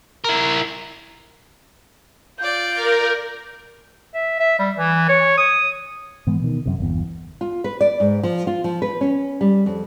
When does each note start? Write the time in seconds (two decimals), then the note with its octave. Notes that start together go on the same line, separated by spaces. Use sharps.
0.24 E4 A#4
2.39 F4 D5 G6
2.74 A#4
4.14 E5
4.40 E5
4.59 G3
4.77 E3
5.09 C#5
5.38 D#6
6.27 G#2 E3 G#3 B3
6.40 B2 D#3
6.66 F#2 C3
6.78 G1 E2
7.41 F4
7.64 B4
7.81 D5
8.00 G#2
8.23 F3
8.47 F4
8.64 F3
8.82 B4
9.01 C#4
9.41 G3
9.66 F2